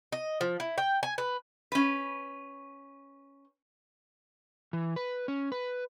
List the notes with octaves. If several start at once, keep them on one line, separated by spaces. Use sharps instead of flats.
D#5
F3
E4
G5
G#5
B4
C#4 B4
E3
B4
C#4
B4